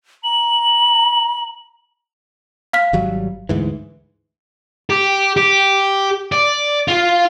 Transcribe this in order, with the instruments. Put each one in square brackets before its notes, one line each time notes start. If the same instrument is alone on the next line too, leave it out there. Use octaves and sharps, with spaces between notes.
[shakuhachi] A#5 [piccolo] F#7
[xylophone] F5 F6 B6
[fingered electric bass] G#1 F#3 G3
D2 G#2 E3
[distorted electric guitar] G4
G4
D5
F4 F5